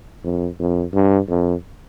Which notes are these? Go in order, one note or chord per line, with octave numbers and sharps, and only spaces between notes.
F2
F2
G2
F2